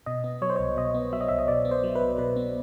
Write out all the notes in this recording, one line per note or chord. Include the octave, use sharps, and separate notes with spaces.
B2 D#5
B3
F#3 C#5
C5
C#5
C2
B2 D#5
B3
F#3 E5
D#5
C2 E5
D#5
B2 D5
B3
C5
F#3
B4
C2
B2 B4
B3